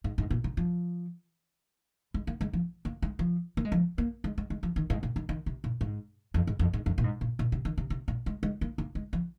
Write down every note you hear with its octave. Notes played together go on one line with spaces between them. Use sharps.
G#2
G#2
A#2
C3
F3
G#3
A#3
G#3
F3
A#3
G#3
F3
A#3
G#3
F3
A#3
G#3
G#3
G#3
F3
D#3
G#2
A#2
D#3
D#3
C3
A#2
G#2
F2
G#2
F2
G#2
F2
A#2
G#2
A#2
A#2
C3
D#3
C3
C3
A#2
G#3
G#3
A#3
A#3
G#3
F3